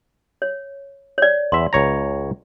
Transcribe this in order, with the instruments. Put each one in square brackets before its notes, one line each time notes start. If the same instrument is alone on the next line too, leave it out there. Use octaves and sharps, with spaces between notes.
[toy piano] C#5
C#5 D5
[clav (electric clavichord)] E2 E5 [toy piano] C6
[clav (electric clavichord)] C#2 C#5 A#5